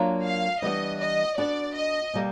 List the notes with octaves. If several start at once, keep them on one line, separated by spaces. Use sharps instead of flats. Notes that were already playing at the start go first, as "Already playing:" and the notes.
Already playing: F#3 A#3 D4 F4 A#4
F5
E3 G3 B3 D4 D#5
D#5
B3 D4 F#4 D5
D#5
B2 G3 A#3